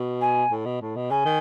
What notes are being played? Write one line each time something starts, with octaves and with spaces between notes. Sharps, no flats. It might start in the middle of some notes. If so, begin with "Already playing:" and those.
Already playing: B2
G#5
A2
B2
A2
B2
C#3 G#5
D#3